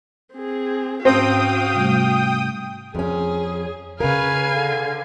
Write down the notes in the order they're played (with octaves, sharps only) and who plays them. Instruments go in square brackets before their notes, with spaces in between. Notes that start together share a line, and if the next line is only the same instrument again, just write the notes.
[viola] C4 G#4
[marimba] G#2 C#4 A5 [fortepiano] C4 [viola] F#4 F5 [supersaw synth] G5 D#6
[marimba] C3 G3 A3
[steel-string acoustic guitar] F2 C#4 [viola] G#4
[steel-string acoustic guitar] C#3 A#4 [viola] C#4 B4 [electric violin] F5 G#5
[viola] D3